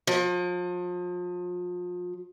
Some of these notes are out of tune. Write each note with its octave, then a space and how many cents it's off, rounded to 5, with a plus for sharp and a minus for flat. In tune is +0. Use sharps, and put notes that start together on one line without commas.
F3 +35